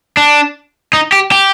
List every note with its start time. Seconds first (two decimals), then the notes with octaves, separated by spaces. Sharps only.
0.17 D4
0.93 D#4
1.12 G4
1.32 G4